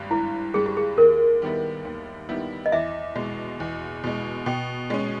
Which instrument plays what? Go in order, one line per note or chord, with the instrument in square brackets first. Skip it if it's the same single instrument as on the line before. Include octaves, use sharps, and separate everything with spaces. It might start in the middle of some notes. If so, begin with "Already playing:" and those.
Already playing: [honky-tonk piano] G#1 G2 G3
[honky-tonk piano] G#1 [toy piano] E4
[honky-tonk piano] G2 G3 [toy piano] G#4
[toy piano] G4
G#4
[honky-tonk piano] D#2 [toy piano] A#4
[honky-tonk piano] D#3 G3 B3 E4
D#2
D#3 G3 B3 E4
[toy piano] D#5
[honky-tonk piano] E2 [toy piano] E5
[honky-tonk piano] B2 G#3
E2
B2 G#3
[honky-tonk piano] B2 [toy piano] G5
[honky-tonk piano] G#3 C#4